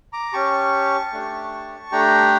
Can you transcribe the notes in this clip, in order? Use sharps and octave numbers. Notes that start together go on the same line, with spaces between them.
A#5 D6
C#4 G4 A5 C#6
A3 D4 G4
A3 D4 G4 G5 A#5